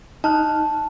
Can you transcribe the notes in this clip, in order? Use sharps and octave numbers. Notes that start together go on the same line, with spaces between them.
D#4 A5 F6 F#6